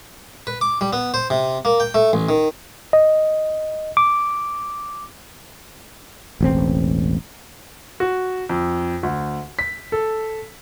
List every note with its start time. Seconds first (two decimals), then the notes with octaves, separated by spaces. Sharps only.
0.47 B4
0.61 D6
0.81 G3
0.93 B3
1.14 C5
1.30 C3
1.65 A#3
1.80 G5
1.95 A3
2.13 A1
2.29 D#3
2.93 D#5
3.97 D6
6.41 E1 A1 C4
8.00 F#4
8.49 F2
9.03 D2
9.59 B6
9.92 A4